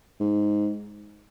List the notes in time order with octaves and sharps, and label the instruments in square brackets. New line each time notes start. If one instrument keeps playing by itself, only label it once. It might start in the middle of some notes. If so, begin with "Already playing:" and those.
[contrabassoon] G#2